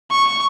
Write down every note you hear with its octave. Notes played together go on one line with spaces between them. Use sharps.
C#6